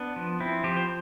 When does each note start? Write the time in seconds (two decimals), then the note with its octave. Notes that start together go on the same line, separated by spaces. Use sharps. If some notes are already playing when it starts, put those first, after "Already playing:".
Already playing: B3 D4
0.16 F3
0.40 C4 E4
0.64 F3 G4
0.77 C5